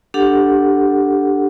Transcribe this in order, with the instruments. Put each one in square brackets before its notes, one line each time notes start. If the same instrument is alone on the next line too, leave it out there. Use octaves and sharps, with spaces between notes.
[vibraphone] D4 G4 A4 F#5